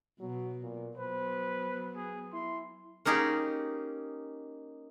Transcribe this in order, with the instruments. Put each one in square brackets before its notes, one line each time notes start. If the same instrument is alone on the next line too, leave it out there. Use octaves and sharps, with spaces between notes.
[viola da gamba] B2 [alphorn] F#3
[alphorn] A#2
[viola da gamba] F#3 B3 [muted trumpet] B4 [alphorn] C5
[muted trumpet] G#4
[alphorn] E4 [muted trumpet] C6
[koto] A#3 C#4 D#4 G4 G#4